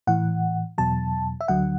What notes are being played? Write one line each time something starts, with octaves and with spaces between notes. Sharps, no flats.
A2 E3 F#5
E2 B2 F#3 A5
E5
D2 D3 F#3 F#5